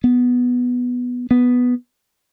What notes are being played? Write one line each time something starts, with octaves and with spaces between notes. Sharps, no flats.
B3
B3